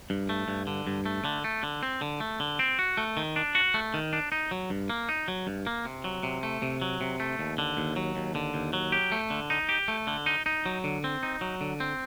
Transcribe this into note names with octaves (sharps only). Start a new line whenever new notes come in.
G2
A3
G2
D3
G2
A3
D3
A3
D3
C4
D3
A3
D3
C4
F#4
A3
D#3
D4
F#4
A3
D#3
D4
D#4
F#3
G2
A#3
D#4
F#3
G2
A#3
C3
F#3
C3
A3
C3
F#3
C3
A3
D#2
D3
D#2
F#3
D#2
D3
D#2
F#3
G4
A3
D3
D#4
G4
A3
D3
D#4
D#4
F#3
D3
C4
D#4
F#3
D3
C4